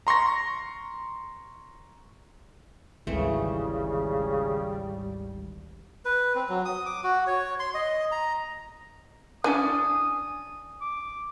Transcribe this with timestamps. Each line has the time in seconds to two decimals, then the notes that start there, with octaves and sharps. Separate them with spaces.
0.07 A#5 C6 C#6 A#6
3.07 G#1 D2 C#3 E3 G3 A3 C4
6.05 B4
6.35 C4
6.49 F#3
6.65 D#6
6.86 D6
7.04 F#4
7.27 C#5
7.59 C6
7.74 D#5
8.12 A#5
9.44 E3 C#4 D4 G#5 D#6
10.82 D6